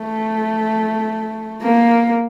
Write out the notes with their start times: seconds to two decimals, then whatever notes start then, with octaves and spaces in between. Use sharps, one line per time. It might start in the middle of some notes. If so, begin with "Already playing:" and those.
Already playing: A3
1.62 A#3